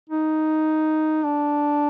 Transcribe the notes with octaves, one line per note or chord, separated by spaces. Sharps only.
D#4
D4